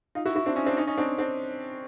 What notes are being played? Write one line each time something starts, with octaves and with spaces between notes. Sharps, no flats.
D#4 F4
E4 F#4
E4 F#4
C4 D4
C#4 D#4
C4 D4
C#4 D#4
C#4 D#4
C4 D4
C4 D4